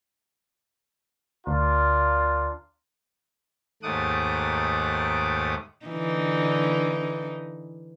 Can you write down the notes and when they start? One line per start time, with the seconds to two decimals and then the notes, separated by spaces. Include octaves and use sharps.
1.47 D2 D4 F4 A#4
3.83 D#2 G#2 A3 F#5 D6 D#6
5.86 D3 E3 D#4